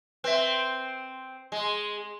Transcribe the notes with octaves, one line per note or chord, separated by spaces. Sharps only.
C4 B4 E5
G#3